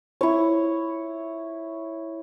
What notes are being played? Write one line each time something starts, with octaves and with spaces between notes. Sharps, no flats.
E4 C#5